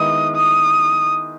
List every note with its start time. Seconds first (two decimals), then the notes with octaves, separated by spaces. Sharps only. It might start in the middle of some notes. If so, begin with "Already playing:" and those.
Already playing: D#3 G#3 B3 E4 D#6
0.36 D#6